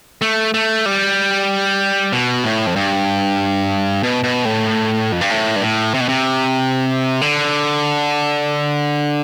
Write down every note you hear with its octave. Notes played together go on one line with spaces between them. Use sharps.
A3
A3
G3
B2
A2
F2
G2
B2
B2
A2
F2
G2
A2
G2
A2
C3
B2
C3
D3